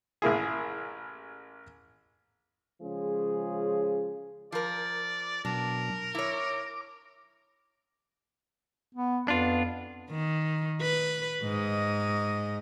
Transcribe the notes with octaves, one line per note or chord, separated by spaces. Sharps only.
A1 A#3 E4 G#4
C#3 F3 G#3 C#4 F4 G#4
F3 A#4 D5
B2 F#3 D4 A#4
E4 C#5 D6
B3
F2 B3 D4 F4
D#3
B4
G#2 D#5